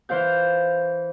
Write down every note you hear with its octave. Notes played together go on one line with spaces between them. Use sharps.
E3 C5 F5 G6